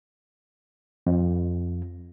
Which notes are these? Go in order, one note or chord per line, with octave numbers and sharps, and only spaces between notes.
F2